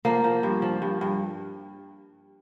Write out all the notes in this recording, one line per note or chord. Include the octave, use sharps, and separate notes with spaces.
F3 A#3
F3
G2
F3
G2
G2